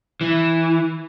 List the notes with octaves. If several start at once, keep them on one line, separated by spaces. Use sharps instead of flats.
E3